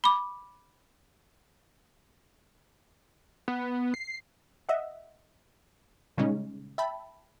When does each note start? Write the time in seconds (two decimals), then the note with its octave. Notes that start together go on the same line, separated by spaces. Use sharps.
0.04 B5 D6
3.48 B3
3.94 C7
4.69 D#5 E5 F#5
6.17 A#2 C#3 G3 G#3 C#4 D#4
6.78 E5 G5 A5 B5